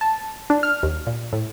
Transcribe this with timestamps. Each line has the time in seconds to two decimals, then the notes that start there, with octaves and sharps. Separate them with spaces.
0.01 A5
0.50 D4
0.63 F6
0.83 D#2
1.07 A#2
1.33 A2